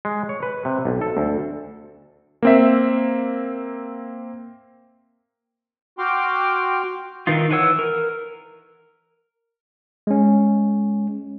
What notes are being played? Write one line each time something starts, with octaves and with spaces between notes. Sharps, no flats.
G#3
C#5
B4
C3
B1
A4
D2
A#3 C4 E5
F#4 G5 C6 D6 F6
D#3 E3 D#4 F4
E3 B4 C#5 F#5 E6
A#4
G#3 C#4